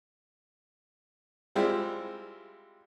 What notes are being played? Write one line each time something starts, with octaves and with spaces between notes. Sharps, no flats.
G3 G#3 C4 E4 F4